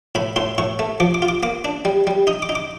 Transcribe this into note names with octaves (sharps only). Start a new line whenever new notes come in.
A2 B5
A2 C6
A2 C#6
A3
F3 D6
D6
F4
D6
A#3 D6
D4
G3
G3
D#4 D#6
D6
D#4
D6